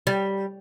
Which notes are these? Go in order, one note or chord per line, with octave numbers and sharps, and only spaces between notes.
G3